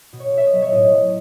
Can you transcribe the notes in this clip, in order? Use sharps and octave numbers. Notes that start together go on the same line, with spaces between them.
B2
C#5
B2 E5
D#5
F#3
C#5
A2 D#5
F#3